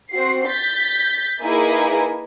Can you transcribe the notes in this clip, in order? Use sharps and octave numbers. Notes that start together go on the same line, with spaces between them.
C4 F#4 C7
G6 A6 B6
A#3 D#4 E4 G#4 B4 G#5